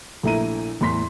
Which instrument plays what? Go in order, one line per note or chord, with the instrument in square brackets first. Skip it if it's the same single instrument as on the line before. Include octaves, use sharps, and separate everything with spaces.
[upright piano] A#1 A3 E4 A#5 D#7
E2 A2 C6 B6